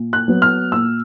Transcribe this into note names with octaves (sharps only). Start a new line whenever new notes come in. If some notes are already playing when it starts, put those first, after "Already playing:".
Already playing: A#2
F#6
F#3 B3
F6
A#2 E6